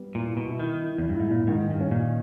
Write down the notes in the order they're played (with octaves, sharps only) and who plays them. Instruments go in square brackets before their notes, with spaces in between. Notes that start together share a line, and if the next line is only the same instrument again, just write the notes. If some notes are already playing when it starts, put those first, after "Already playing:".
Already playing: [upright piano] G3 B3
[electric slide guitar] A#2 [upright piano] E4
[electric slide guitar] B2
[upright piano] E4
[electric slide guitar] D#3
[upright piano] E4
[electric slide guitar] E2
G2
[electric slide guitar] G#2 [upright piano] E4
[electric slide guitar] A#2
[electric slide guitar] G#2 [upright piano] D#3
[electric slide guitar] G2
[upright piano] C#4
[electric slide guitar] A#2